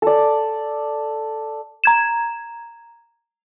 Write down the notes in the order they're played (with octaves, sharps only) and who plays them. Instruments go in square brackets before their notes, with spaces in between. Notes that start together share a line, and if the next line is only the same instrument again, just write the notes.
[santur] A4 D5
[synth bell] A#5 G#6 E7